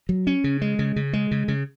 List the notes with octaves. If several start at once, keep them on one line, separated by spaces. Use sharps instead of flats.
F#3
C#4
C#3
G#3
C#3
C#3
G#3
C#3
C#3